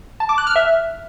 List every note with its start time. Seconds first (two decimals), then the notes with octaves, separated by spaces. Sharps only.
0.20 A5
0.29 D6
0.38 F#6
0.47 F6
0.56 E5